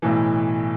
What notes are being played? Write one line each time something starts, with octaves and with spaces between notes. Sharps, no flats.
B1 A2 E3